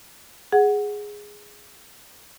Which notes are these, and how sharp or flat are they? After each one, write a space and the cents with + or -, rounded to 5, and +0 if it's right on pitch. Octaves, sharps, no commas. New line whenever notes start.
G#4 +0 F#5 +0